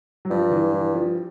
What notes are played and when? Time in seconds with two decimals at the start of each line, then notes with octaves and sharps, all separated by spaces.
0.25 F#3
0.30 G2 F3
0.52 E3
0.74 E3
0.94 F3